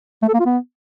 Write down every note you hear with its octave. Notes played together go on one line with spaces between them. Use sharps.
A3
A4
A#3
F4
B3